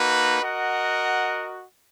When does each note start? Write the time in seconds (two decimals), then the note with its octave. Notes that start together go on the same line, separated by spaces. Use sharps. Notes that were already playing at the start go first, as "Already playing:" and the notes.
Already playing: A#3 D#4 F#4 B4
0.42 F#4 A#4 D#5 F#5